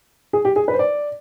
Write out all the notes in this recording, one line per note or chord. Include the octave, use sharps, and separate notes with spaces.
G#4
G4
G#4
B4
C5
D5